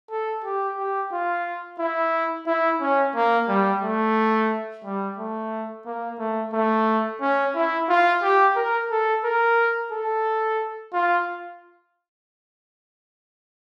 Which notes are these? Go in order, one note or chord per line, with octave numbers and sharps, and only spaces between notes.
A4
G4
G4
F4
E4
E4
C#4
A#3
G3
A3
G3
A3
A#3
A3
A3
C#4
E4
F4
G4
A#4
A4
A#4
A4
F4